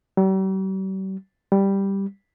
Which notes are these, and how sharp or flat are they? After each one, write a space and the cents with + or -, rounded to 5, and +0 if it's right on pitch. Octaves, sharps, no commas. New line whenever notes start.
G3 -45
G3 +0